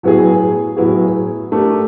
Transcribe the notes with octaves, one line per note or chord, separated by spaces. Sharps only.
A2 F#3 B3 E4 G#4
A2 F#3 B3 E4 G#4
A3 D4 G4 A#4